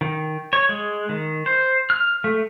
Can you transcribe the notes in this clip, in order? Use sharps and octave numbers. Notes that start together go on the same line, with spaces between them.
D#3
C#5
G#3
D#3
C5
F6
A3